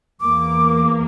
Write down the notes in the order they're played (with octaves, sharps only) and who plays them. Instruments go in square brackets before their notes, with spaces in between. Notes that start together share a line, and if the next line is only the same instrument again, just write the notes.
[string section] E2 E3 A#3 [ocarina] D6